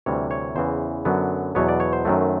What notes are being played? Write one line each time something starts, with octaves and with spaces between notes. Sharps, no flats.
D2 C3 E3 G3 C#5
C#5
E2 C#3 E3 C5
F#2 D3 F#3 B3
E2 B2 F#3 B3 C#5
D5
C#5
C5
F#2 D#3 F#3 A3